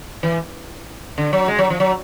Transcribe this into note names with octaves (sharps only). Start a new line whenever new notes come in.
E3
D3
F#3
G#3
F#3
F3
F#3